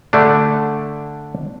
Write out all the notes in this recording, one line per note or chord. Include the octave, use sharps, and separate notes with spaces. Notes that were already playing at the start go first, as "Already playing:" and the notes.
D3 A3 D4